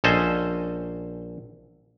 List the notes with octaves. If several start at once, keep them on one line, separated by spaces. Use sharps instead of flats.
A#1 C#4 A4 C5 D#5 G#5